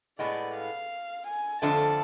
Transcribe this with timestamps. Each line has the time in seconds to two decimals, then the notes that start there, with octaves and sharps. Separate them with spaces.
0.19 A2 G#3 B3 D5
0.55 F5
1.27 G#5
1.62 F2 D3 F3 A3 D4 A5